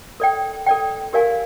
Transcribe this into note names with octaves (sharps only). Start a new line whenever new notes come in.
A4 D5 G5
A4 D5 G5
G4 A#4 D5 F5 G#5